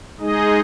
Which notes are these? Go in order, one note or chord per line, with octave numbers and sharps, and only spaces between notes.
G#3 D#4 G#4 D#5